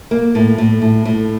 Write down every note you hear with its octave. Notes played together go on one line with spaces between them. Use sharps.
A#3
A2
A2
A2
A2